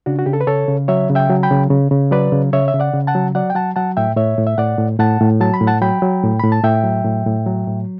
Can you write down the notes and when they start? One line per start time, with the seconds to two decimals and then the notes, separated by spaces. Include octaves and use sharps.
0.06 C#3 D4 F#4
0.19 F#4
0.26 C#3 G4
0.33 A4
0.41 B4
0.47 C#3 A4 C#5
0.68 C#3
0.88 F#3 C#5 E5
1.10 C#3
1.15 E5 G5
1.30 F#3
1.43 G5 B5
1.50 C#3
1.71 C#3
1.91 C#3
2.11 F#3 B4 D5
2.32 C#3
2.53 C#3 C#5 E5
2.68 E5
2.74 C#3
2.80 D5 F#5
2.93 C#3
3.07 F#5 A5
3.15 F#3
3.35 F#3 D5 F#5
3.50 G5
3.55 F#3 F#5 A5
3.76 F#3 F#5 A5
3.97 A2 E5 G5
4.17 A2 C#5 E5
4.38 A2
4.47 E5
4.58 A2 D5 F#5
4.78 A2
4.99 A2 F#5 A5
5.21 A2
5.40 F#3 A5
5.54 B5
5.61 A2
5.67 F#5 A5
5.81 F#3 G5 B5
6.02 F#3
6.23 A2
6.40 A2 B5
6.52 A5
6.63 A2 E5 G5
6.84 F#3
7.04 A2
7.26 A2
7.46 F#3
7.67 A2